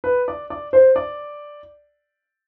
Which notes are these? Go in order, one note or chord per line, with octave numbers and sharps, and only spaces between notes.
B4
D5
D5
C5
D5